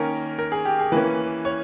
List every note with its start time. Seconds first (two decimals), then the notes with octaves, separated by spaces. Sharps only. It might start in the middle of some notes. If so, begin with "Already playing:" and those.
Already playing: D#3 A#3 C#4 A#4
0.39 A#4
0.52 G#4
0.65 G4
0.79 G#4
0.92 E3 A#3 C#4 B4
1.45 C#5